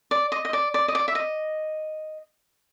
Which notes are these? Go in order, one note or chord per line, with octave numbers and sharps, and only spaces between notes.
D5
D#5
D#5
D5
D5
D#5
D5
E5
D#5